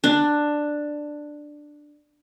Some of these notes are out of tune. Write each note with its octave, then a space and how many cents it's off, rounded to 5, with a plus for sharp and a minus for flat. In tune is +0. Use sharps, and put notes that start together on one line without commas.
D4 +10